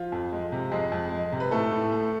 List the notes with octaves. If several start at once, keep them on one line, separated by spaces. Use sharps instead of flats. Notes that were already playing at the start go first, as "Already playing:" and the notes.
Already playing: F3 F4
F2
G#3
C3
F2 G#3 G#4
F2
G#3
C3
B4
A2 A3 A4
A2
A3